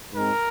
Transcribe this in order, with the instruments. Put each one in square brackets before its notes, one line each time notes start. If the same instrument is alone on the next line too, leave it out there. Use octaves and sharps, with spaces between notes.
[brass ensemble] G#2 G#3 C4 A#4